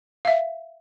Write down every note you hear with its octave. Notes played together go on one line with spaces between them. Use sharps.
E5 F5